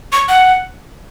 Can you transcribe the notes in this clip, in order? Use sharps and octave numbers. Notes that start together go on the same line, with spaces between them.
C#6
F#5